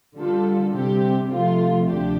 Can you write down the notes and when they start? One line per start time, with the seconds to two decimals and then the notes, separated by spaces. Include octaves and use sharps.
0.16 D3 G3 F4 A4
0.73 C3 G3 C4 G4
1.31 C3 F3 A3 F4
1.87 D2 C3 F3 D4 G4